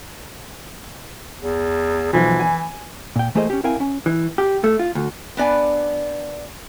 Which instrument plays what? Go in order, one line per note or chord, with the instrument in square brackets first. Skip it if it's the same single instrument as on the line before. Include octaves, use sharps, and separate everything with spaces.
[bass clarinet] E2
[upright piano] B1 F3 [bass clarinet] E3
[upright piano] G#5
[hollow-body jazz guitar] A#2 G5
E3 A3 A#3 G#4 C5 D#5
C#4 G4
C4 E4 A#4 F5 G5 G#5
C#4
E3
G4
A3
F4
D2
[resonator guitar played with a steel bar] B3 D4 D5 G#5